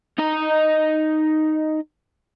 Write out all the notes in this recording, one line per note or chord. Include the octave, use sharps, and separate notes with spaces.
D#4 D#5